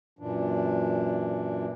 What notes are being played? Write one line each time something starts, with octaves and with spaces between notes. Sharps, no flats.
F#2 A#2 E3 D4